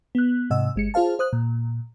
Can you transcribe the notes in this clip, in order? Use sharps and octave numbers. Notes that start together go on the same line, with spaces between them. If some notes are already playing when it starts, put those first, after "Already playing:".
B3 F#6
G#2 C3 D#5 F#5 E6
G1 G#3 C#7
F4 G#4 C5 F5 A5
C5 D#6 F#6
A#2